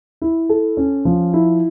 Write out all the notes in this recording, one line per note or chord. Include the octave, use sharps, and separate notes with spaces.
E4
A4
C#4
F3
E4